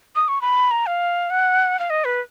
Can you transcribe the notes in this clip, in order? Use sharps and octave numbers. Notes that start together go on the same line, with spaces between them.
D#6
C#6
B5
A#5
F5
F#5
F5
D#5
B4